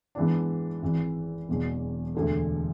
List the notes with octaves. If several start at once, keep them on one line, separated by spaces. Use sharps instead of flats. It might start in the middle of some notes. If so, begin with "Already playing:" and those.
G#2 E3 B3 D4
G#1 G#2 E3
E1 E2 B2 F#3
E1 D2 D3 A3